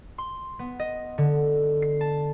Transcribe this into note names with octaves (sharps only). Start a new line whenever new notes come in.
C6
B3
D#5
D3
C7
A5